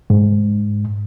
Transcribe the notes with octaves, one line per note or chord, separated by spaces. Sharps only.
G#2